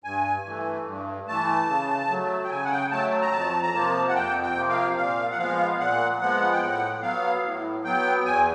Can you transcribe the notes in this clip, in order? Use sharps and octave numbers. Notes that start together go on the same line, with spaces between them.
G2 G#5
E3 A3
G2
E3 A3 A5
C#3
F#3 A3
G5
C#3 G#5
F#5
G5
F#3 A3 A5
A#5
F2 A5
A#5
C3 F3 A#3 A5
F#5
F2 G5
G5
C3 F3 A#3
F5
A#2 F5
F#5
F3 G#3 B3 F5
A#2 F#5
F3 G#3 B3 F#5
G5
A2 F#5
F#3 B3 F5
A2
F#3 B3 G5
E2 G#5